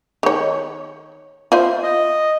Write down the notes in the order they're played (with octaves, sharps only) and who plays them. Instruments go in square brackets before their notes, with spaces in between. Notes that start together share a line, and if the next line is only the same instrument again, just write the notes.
[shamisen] D#3 C#5
F4 C5 E5
[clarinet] D#5